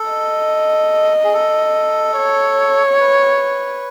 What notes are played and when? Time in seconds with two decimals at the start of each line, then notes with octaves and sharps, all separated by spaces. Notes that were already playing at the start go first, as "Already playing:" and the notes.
Already playing: A4
0.10 D#5
1.24 G#4
1.34 A4
2.18 C#5
3.00 B4